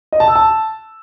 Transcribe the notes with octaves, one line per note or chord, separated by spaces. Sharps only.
D#5
A5
E6
A5